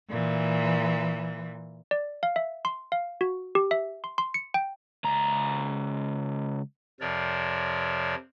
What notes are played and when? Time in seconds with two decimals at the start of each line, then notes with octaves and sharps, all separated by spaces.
0.10 A#2 E3
1.91 D5
2.23 F5
2.36 E5
2.65 C6
2.92 F5
3.21 F#4
3.55 G4
3.71 E5
4.04 C6
4.18 C6
4.34 C#7
4.54 G5
5.04 C#2 A#5
7.00 F2 C3 F3 A#4 C#5 D5